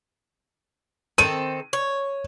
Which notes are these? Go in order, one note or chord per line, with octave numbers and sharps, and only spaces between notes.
D#3 C4 A4 D#7
C#5